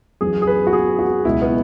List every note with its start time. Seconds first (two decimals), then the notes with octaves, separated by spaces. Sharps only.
0.21 F#2 E3 G#4
0.42 G#4
0.47 B4
0.67 F#4
0.73 G#4
0.99 F#4
1.25 C#2 B2 F#3 E4
1.42 B3